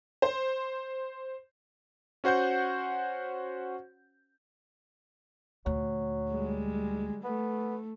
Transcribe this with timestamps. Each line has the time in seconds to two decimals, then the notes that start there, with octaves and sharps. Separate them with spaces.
0.22 C5
2.24 C#4 F#4 C5 F#5 G6
5.66 D2 A#2 F#3
6.30 G3 G#3
7.24 A3 B3